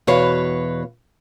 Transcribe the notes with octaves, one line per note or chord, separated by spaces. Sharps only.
E2 B2 F#4 B4 C#5 F5